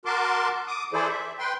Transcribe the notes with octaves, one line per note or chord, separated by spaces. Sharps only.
F#4 A#4 A5 C6 D6
D6 D#6
E3 E4 G#4 A4 C5 D5
E5
B4 G5 C6